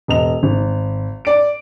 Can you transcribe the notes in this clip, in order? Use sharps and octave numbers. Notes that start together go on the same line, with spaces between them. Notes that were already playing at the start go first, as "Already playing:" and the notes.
E1 D#5 F7
G#1
D5 D7